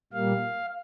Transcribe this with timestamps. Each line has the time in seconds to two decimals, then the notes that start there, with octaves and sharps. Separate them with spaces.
0.13 A#2 G3 A#3 F5